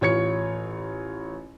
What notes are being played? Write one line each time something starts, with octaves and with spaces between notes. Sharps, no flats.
A1 F4 C#5 G#6 C#7